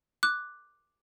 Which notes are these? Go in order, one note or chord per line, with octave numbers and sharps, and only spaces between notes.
D6 F#6